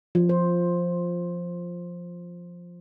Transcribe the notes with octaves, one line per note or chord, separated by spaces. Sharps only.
F3
C5